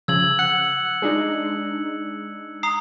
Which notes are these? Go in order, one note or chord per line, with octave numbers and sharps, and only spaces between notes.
C#3 F3 E6 G#6 F#7
F#5 F#6 C#7 F#7
G#3 D4 D#4
A#5 D#6 C7